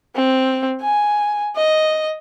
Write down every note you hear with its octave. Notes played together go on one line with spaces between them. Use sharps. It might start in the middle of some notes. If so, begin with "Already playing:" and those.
C4
G#5
D#5